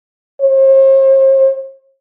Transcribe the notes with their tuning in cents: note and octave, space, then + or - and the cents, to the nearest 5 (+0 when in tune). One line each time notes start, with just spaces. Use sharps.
C5 +45